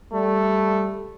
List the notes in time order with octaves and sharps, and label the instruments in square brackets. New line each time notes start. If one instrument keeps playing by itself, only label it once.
[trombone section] G3 [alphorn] A3